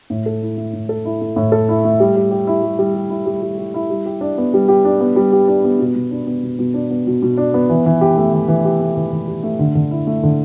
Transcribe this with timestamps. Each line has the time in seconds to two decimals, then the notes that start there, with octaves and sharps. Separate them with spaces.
0.10 A2
0.26 A4
0.42 E4
0.57 A3
0.73 A2
0.89 A4
1.05 E4
1.21 A3
1.36 A2
1.52 A4
1.69 E4
1.84 A3
2.00 G3
2.16 G3
2.31 G4
2.47 E4
2.63 G3
2.79 G3
2.94 G4
3.10 E4
3.26 G3
3.42 G3
3.58 G4
3.74 E4
3.90 G3
4.06 G4
4.21 D4
4.38 B3
4.54 G3
4.68 G4
4.85 D4
5.00 B3
5.16 G3
5.32 G4
5.48 D4
5.64 B3
5.79 B2
5.95 B2
6.11 D4
6.27 B3
6.43 B2
6.59 B2
6.74 D4
6.91 B3
7.07 B2
7.22 B2
7.37 D4
7.54 B3
7.69 E3
7.86 E3
8.01 G4
8.18 A3
8.33 E3
8.48 E3
8.65 G4
8.81 A3
8.96 E3
9.12 E3
9.28 G4
9.43 A3
9.59 D3
9.75 D3
9.91 E4
10.07 A3
10.23 D3